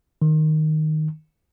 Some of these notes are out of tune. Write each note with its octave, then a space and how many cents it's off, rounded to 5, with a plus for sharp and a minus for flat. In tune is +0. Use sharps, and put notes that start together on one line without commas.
D#3 -5